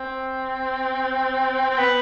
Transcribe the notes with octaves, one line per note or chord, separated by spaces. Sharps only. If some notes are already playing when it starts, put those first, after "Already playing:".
Already playing: C4
C4
B3